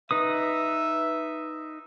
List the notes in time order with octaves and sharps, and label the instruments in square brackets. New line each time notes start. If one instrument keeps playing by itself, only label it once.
[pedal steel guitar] D#4 B4 D#6 [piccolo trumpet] E5